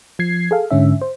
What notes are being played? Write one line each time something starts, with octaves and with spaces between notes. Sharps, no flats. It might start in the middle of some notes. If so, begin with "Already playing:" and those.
F3 G#6 C7
G#4 A4 F5
G#2 D3 C#4 E5
C5